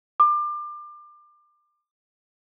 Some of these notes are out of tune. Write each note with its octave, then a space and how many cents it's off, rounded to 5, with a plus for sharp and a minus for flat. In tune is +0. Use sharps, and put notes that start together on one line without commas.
D6 +30